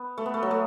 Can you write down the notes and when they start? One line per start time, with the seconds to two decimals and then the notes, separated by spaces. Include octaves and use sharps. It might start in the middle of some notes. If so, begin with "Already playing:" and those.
Already playing: B3
0.18 A3
0.26 B3
0.34 A3
0.43 F#3
0.51 A3